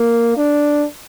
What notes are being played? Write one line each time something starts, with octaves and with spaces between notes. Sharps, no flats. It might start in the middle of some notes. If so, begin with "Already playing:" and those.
Already playing: A#3
D4